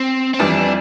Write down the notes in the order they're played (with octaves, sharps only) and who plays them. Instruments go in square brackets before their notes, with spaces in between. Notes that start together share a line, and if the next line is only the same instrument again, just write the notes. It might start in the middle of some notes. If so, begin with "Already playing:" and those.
Already playing: [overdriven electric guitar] C4
C4
[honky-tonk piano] F2 E3 G3 [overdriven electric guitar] D4